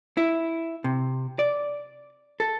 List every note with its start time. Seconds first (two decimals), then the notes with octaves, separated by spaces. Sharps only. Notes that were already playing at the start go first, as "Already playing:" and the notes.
0.17 E4
0.84 C3
1.39 D5
2.40 A4